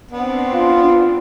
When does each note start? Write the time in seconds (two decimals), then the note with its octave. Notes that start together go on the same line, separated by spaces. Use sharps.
0.12 B3 C4 D4
0.54 F4